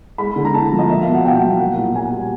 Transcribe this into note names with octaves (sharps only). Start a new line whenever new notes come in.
G#3 B5
D3
A#5
D3 A5
F3
D#5
A#3 E5
F5
B2
F#5
B2 G5
F#3
A#3 F#5
A#2
A#2 G#5
G3